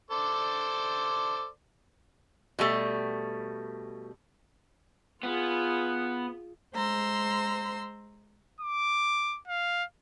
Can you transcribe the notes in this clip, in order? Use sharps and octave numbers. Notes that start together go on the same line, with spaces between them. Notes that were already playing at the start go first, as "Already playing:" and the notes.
A4 C5 D5
B2 G3 A3
B3 F4 G#4
G#3 C5 A#5 C6 E6
D6
F5